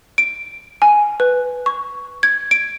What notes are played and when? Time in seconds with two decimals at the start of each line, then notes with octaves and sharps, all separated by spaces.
0.18 D7
0.82 G#5
1.20 B4
1.66 C#6
2.23 G#6
2.51 D7